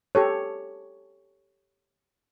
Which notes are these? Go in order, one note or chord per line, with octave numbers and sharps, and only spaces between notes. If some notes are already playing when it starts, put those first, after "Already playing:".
G4 A4 C#5